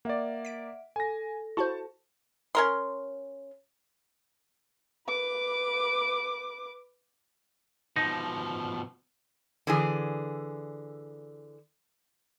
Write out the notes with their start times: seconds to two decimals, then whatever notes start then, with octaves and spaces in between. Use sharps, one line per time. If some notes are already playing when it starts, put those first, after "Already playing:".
0.05 A#3 D5 E5 F#5
0.45 B6 D7
0.96 A4 G#5 A#6
1.57 E4 F#4 C5 A5 C#6
2.55 C#4 A#4 C6
5.07 B4 D6
7.96 B2 F3 D#4
9.67 D3 E3 G#4